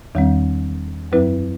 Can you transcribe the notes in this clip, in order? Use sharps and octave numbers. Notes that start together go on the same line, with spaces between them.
E2 D#3 G3 C4
F#2 F#3 C4 E4 B4